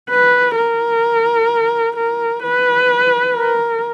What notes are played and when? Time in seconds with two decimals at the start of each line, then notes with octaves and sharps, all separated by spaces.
0.10 B4
0.56 A#4
1.97 A#4
2.43 B4
3.36 A#4